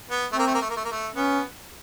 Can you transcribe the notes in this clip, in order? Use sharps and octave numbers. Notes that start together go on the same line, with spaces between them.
B3
A3 C4
A#3
A3
A#3
A3
A#3
A3
A#3
A3
B3 C#4